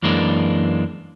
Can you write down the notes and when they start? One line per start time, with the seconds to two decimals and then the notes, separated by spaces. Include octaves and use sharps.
0.03 F#2 E3 G#3 A#3 D4